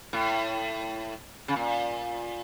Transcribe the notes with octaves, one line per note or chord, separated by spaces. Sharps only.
A2
C#3
A#2